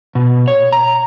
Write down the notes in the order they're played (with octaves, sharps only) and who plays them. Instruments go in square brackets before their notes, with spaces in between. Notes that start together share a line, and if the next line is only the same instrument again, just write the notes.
[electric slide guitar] B2
C#5
A#5